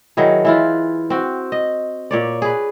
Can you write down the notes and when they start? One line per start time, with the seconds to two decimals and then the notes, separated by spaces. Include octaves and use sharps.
0.17 D#3 F#3 E4 G#4
0.45 E3 E4 F4
1.10 C4 F#4
1.52 D#5
2.11 A#2 C#5 D5
2.42 G#4 B4